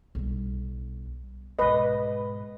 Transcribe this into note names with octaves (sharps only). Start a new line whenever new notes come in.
B1 G3
G#2 B2 B4 D#5